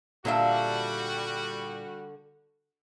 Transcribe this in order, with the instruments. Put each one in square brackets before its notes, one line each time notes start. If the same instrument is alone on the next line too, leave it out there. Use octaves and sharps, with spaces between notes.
[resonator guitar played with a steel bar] A#2 D4 E5 [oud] D3 F4 [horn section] G3 F#4